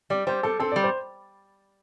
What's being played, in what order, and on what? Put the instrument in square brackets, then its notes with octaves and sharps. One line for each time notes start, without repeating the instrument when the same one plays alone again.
[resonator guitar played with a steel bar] G3 [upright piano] D5
[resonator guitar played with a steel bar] G3 [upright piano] C5
[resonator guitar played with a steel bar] G3 [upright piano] A4
[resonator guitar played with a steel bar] C4 [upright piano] A4
[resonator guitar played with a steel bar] G3 [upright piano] D5
[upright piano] C5